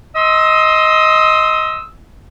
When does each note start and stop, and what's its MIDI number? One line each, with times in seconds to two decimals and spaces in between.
0.16 1.85 75
0.16 1.85 84
0.16 1.85 87
0.16 1.85 88